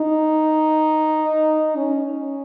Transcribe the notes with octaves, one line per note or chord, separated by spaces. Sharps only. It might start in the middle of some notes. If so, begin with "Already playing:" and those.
Already playing: D#4
C#4